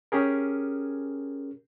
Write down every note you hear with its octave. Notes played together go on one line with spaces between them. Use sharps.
C#4 G4 G#4 A#4